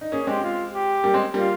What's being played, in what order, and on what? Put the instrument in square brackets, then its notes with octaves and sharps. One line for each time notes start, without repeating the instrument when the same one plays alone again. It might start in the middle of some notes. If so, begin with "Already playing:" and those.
[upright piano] D#4
[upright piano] A#3 C#4 [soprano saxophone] G#4
[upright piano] G#3 C4 [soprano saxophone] G4
[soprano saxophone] F4
G4
[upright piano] G3 A#3
G#3 C4
[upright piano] G3 A#3 [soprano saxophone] F4